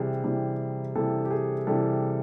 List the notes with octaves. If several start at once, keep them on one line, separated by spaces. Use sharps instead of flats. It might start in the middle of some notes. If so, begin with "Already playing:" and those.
Already playing: C3 E3 G3 G#4
C3 E3 G3
C3 E3 G3 A4
G4
G#4
C3 E3 G3 A4